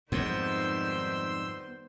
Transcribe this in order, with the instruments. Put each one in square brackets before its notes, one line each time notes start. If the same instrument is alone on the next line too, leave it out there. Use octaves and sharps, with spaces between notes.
[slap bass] F2 G#2 [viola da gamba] D#3 G3 C5 [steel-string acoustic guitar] B3 [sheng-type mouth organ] C6 E6